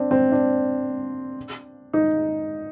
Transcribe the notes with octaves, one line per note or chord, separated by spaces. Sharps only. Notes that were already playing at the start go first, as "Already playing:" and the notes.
Already playing: C4 D4
C4
D4
D#4